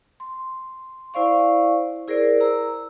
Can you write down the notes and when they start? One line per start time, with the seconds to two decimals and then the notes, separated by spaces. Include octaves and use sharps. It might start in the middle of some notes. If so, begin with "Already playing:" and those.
0.20 C6
1.14 E4 C5 D5 F5 C#6
2.08 E4 G#4 A#4 C5 D5
2.40 A#5 E6